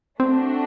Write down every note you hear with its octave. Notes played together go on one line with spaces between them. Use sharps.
A3 C4 D4 F#4